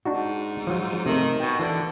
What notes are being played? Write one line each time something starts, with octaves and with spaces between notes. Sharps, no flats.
G#2 D4 D#4 F#4
F3 F#3
C3 D#3 A3
B2 G5
D3 E3 E5